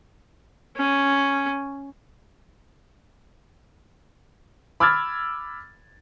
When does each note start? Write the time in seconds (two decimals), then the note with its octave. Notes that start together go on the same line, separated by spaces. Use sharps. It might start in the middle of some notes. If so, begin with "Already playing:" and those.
0.77 C#4
4.80 B5 D6 E6 F6 G#6 A6